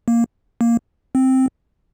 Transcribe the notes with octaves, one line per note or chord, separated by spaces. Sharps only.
A#3
A#3
C4